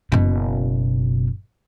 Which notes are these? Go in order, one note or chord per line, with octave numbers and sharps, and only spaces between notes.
F#1 B2